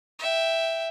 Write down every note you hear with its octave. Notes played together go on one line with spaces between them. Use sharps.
E5 G5